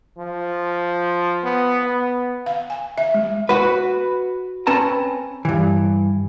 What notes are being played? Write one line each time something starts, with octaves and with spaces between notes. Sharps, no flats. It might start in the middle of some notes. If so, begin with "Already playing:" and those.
F3
B3
B3
F5
G#5
E5
G#3
F#4 B4
C4 C#4 B4 A5 A#5
G2 E3